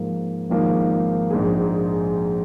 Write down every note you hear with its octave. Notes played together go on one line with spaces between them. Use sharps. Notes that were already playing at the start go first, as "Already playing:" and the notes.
Already playing: G#2 F3 A#3
G#1 G#2 F3 A#3 D#4
A#1 G#2 G#3 D#4 G#4